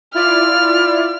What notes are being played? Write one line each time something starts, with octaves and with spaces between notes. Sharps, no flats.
E4 F4 D5 F6